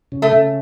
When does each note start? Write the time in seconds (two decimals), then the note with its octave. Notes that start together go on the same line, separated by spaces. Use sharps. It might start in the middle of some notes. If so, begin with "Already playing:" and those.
0.12 C#3
0.22 A3
0.33 C#3